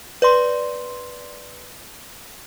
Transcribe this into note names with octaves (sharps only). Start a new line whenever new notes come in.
B4 D5 C6